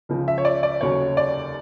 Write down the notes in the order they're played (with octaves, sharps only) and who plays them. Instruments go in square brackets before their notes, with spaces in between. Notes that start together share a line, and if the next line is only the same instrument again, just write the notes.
[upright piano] C#2 C#3 F3
E5
C#5
D5
D5
F1 D#2 C#3 F#3 C#5
D5